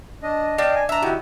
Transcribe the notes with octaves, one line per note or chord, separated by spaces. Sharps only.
D4 D#5
D4 D#5 F5 G5
G#5
D4 E5 A#5
D#3 E4 F#4 G4